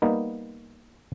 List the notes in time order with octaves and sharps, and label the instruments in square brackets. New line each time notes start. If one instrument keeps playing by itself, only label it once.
[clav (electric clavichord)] G3 A#3 B3 D#4